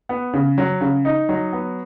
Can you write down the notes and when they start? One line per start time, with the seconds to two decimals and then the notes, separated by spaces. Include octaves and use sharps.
0.09 B3
0.33 C#3
0.58 F#3
0.81 C#3
1.05 D#4
1.29 F#3
1.53 B3